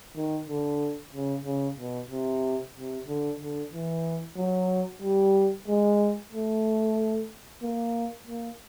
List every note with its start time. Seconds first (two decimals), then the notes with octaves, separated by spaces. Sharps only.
0.16 D#3
0.48 D3
1.13 C#3
1.45 C#3
1.78 B2
2.11 C3
2.76 C3
3.08 D3
3.40 D3
3.73 E3
4.37 F#3
5.02 G3
5.68 G#3
6.33 A3
7.63 A#3
8.27 A#3